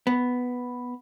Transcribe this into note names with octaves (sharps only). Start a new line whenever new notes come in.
B3